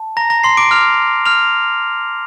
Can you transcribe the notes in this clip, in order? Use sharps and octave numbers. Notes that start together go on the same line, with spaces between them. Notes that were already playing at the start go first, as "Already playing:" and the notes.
Already playing: A5
A#5 A#6
A#5 A#6
C6 C7
D6 D7
A#5 F6 F7
F6 F7